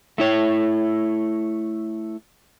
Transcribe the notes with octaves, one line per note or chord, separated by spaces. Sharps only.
A3 E4 C#5